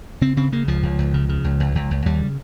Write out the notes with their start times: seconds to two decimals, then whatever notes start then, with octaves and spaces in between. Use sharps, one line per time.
0.21 C#3 C4
0.37 C#3 C4
0.52 C#3 A#3
0.68 C#2 F3
0.83 C#2
0.99 C#2
1.14 C#3
1.29 C#3
1.44 C#2
1.60 C#2
1.75 C#2
1.91 C#2
2.06 D#2 G3
2.21 C#3